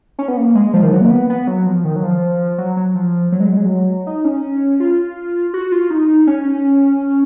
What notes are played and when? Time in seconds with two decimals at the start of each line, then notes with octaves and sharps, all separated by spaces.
0.19 C#4
0.28 B3
0.37 A#3
0.55 G#3
0.74 F3
0.83 D#3
0.92 F#3
1.01 A#3
1.10 B3
1.30 B3
1.47 F#3
1.66 F3
1.85 D#3
1.96 F#3
2.03 F3
2.58 F#3
2.77 F#3
2.95 F3
3.32 F#3
3.40 G#3
3.49 F#3
3.57 G#3
3.65 F#3
4.07 D#4
4.25 C#4
4.80 F4
5.54 F#4
5.72 F4
5.90 D#4
6.27 C#4